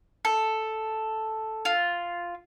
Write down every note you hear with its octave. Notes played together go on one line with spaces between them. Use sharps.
A4
F4